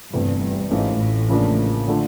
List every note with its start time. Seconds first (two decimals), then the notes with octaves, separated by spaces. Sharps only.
0.13 G1 E2 G2 C3 E3 A3
0.71 G#1 G#2 E3 A3 C#4 F4
1.00 A1 A2
1.29 C#3 F3 A#3 D4
1.88 D3 F3 A3 D4 F4